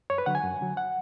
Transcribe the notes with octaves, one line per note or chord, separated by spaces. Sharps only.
F#2 C#5
B4
D3 F#3 F#5
G#5
F#2
D3 F#3
F#5